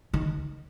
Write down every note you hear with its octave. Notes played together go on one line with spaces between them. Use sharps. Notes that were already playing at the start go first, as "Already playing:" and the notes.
D#3